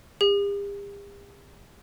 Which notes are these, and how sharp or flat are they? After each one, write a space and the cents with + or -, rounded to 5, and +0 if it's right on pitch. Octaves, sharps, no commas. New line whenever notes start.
G4 +45